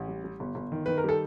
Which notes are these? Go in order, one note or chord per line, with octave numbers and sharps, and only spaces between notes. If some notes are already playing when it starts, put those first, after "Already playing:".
Already playing: A1 G4
G3
G3
G1
G1
D#3
D#3 B4
A#4
G3 A4